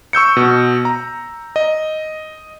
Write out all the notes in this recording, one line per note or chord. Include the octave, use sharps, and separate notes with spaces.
C#6 E6 G6 C#7
B2
A#5
D#5